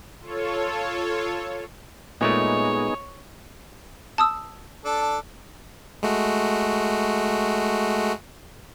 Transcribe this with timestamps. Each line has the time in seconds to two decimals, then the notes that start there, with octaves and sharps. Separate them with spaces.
0.21 F4 A4 C#5
2.21 A#2 G#3 A3 B3 D#4 G#4 C#5
4.18 A5 D#6 E6
4.85 D4 A4
6.03 G#3 A3 F#4